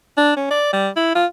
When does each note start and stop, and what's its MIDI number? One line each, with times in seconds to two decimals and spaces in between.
0.17 0.35 62
0.36 0.50 61
0.51 0.72 74
0.73 0.89 55
0.96 1.13 64
1.15 1.26 65